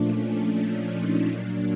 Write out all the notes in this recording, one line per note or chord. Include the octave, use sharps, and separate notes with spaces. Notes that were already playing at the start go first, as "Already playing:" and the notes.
Already playing: A#2 F3 A3 D4
C#4
D4
C#4 D#4
A#2 F#3 A#3 D4